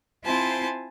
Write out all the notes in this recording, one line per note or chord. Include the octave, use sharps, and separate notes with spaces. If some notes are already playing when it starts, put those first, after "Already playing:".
C4 E4 F4 C5 G#5 A5